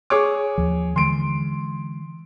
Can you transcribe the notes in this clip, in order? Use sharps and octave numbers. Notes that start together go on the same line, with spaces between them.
G#4 C#5 D6
D#2 F3
D3 E3 G#3 C6 D7